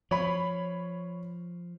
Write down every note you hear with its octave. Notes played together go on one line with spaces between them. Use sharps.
F3 C#5 B5